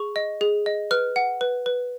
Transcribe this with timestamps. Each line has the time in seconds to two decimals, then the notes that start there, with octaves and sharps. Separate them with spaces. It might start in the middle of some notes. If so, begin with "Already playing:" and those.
Already playing: G#4 C#6
0.16 D#5
0.41 G#4
0.66 D#5
0.91 B4 F6
1.16 F#5
1.41 B4
1.66 B4